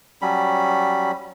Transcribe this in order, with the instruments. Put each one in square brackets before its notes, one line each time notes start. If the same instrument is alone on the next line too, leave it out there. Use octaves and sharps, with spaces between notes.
[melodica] F#3 G3 C#4 B5